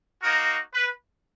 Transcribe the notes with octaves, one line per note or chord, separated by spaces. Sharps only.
A#3 D#4 F#4 A#4
B4